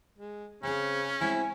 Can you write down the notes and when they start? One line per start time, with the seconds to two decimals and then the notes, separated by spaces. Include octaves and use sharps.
0.19 G#3
0.63 C#3 C4 C#4 G#4
1.21 G#3 C4 E4 F#4 G#5